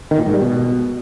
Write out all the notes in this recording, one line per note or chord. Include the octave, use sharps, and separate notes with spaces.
D#3
A#2
G#2
G3
B2